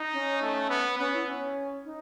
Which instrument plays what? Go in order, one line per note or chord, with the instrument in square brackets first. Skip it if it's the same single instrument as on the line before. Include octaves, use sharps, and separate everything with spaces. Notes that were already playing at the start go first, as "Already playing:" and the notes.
Already playing: [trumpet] D#4
[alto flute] C#4
[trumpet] A3
B3
[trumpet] B3 [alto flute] C#4
[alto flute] E4
C#4
D#4